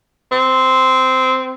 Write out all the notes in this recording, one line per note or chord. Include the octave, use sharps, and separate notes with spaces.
C4